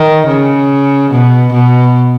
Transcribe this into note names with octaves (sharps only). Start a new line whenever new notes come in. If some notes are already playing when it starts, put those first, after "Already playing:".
Already playing: D#3
C#3
B2
B2